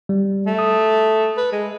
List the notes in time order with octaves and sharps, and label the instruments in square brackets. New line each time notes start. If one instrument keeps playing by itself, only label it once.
[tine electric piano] G3
[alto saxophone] A3
[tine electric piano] D#6
[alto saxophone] B4
G#3